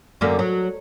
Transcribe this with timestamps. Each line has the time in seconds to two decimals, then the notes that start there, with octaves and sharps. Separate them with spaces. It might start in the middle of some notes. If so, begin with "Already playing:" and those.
0.21 F#2 D3 A#3
0.39 F#3